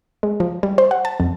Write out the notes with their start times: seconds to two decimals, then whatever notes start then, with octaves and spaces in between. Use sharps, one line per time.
0.23 G#3
0.40 F3
0.63 G3
0.78 C5
0.91 F#5
1.05 A5
1.20 F2